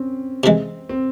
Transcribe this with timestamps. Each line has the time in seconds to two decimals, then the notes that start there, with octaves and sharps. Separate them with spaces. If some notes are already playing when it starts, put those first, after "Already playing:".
Already playing: C4 C#4
0.44 C3 E3 G#3
0.89 C4